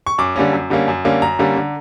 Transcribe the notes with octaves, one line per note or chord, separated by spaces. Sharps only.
C#6
F#2 D6
D3 G3 A#3 C#4
F#2
D3 G3 A#3 C#4
F#2
D3 G3 A#3 C#4
F#2 A#5
D3 G3 A#3 C#4
D3